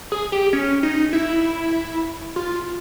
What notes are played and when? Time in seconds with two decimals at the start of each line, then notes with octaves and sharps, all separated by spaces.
0.12 G#4
0.32 G4
0.53 C#4
0.83 D#4
1.13 E4
2.36 F4